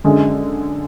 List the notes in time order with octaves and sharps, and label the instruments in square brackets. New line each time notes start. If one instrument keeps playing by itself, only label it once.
[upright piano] F#2 D3 G#3